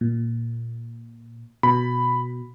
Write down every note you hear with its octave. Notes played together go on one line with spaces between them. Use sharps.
A#2
B2 B5